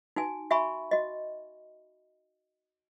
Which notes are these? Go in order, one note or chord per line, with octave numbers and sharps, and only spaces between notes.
D#4 F#4 G#5
F#4 E5 G#5 B5 C#6
F#4 D#5